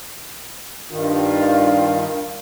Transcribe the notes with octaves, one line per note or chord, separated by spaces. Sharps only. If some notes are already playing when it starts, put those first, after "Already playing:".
G2 D#3 D4 F4